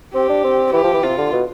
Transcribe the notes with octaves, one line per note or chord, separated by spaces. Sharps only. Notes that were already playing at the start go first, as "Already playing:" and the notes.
C4 G4
D4
C4
E3 G4
F3
E3
C3 F4
D3
B2